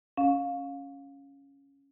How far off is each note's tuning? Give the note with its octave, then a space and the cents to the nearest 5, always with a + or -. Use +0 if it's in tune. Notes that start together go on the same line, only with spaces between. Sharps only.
C#4 +0 F5 +20